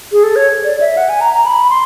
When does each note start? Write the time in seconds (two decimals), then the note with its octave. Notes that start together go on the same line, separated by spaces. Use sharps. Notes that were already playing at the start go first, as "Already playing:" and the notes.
0.12 G#4
0.24 A4
0.36 C#5
0.64 D5
0.80 E5
0.97 F#5
1.09 G#5
1.21 A#5
1.34 A#5
1.46 B5
1.70 C6